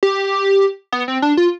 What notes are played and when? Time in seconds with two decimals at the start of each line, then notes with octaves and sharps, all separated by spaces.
0.03 G4
0.92 B3
1.08 C4
1.22 D4
1.37 F4